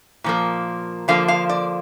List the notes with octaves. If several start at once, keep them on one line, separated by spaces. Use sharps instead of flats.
A#2 F3 A#3
D3 F3 A#3 F5
F5
D5